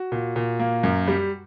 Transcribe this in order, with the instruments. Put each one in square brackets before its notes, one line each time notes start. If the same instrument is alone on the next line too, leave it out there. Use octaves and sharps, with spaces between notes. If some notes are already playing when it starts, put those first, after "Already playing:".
Already playing: [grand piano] F#4
A#2
A#2
A#3
F#2
G3